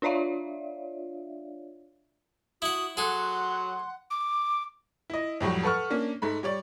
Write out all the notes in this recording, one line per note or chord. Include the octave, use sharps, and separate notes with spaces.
D4 F4 C#5 D5 E5 F5
E4 F#4 F#5 D#6
F#3 G#4 A4 F#5 C6
D6
E4 D#5
F2 A2 F#3 G3
A4 B4 F#5 C#6 F6
A#3 C#4 D4
G#2 A3 B5
G3 C#5 D5